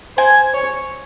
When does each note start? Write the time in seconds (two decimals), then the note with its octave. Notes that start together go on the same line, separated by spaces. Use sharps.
0.17 C5 G#5
0.54 C#5